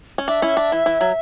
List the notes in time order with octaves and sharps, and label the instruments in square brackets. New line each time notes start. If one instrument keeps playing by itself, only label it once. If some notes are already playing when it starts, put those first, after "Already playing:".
[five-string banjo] C#4
[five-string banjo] D4 [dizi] E5
[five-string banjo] C#4 E4
D4
E3
E3
F#3